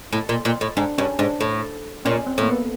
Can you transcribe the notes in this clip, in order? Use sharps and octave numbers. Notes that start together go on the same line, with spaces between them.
A2
A#2
A#2
A2
G#2 D4
G2 C#4
G#2 D4
A2
A#2 C#4
C4
A2 A#3
B3